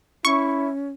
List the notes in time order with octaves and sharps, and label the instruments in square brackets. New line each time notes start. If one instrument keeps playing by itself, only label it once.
[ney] C#4 [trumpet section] E4 [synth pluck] C#6